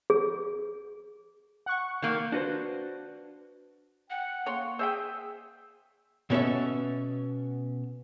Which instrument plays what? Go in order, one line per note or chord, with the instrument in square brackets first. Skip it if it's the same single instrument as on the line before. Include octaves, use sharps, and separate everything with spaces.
[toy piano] G#4
[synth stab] F#5 C#6
[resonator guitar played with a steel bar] D#3 A#3
[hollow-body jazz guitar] D4 F#4 B4 C5
[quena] F#5 [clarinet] G5
[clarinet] A#3 [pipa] C#5 C6
[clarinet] G#4 [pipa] C5 E5 G5 [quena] G#5 [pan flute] E6
[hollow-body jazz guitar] B2 B3 C#4 G#4 A4 E5